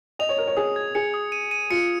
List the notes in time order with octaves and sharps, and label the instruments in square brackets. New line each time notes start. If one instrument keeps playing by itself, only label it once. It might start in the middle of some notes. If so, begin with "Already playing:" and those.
[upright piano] D#5 [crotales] F7
[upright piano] C#5
[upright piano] A#4 [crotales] F7
[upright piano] C#5
[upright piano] G#4 [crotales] D#6
[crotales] G#6
[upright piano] G#4 [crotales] C#7
[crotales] D#6
D#7
D#7
[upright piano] F4 [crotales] C#7